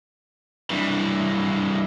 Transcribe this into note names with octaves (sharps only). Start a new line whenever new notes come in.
G2 E3